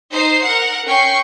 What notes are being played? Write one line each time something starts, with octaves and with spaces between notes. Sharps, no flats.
D#4 C5 C7
A#4 F#5
C#4 G5 C#6 C7